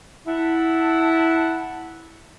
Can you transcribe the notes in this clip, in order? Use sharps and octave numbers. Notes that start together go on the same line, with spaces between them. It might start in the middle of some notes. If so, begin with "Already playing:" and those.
E4 E5 F#5 A5